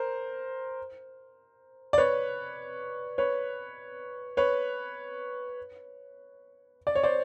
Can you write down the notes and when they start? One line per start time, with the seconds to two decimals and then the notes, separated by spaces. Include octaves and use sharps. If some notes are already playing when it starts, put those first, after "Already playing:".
Already playing: A#4 C5
1.93 D5
1.98 B4 C#5
3.18 B4 C#5
4.37 B4 C#5
6.87 D5
6.95 C#5
7.03 C5 D5